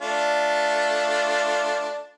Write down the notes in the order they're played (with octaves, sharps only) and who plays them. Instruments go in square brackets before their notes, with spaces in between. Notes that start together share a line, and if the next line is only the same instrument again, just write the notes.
[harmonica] A3 D4 F4